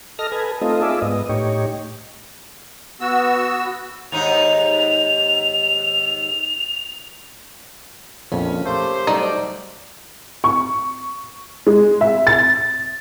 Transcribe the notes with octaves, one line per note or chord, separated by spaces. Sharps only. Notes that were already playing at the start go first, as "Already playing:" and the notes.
A4 D#5 F6 A#6
A4 B4 G#5
A3 C4 D#4 F4 A4 D#5
F4 G#4 D5 E5
G#2 B3 D#5
A2 D#4 G4 C#5
B3 F#4 E6
D#2 G#2 D#4 F7
A#1 F2 C#4
A3 A#3 G4 C5
F#3 G3 A3 D#4 D5
C#6
G#3
E5
A6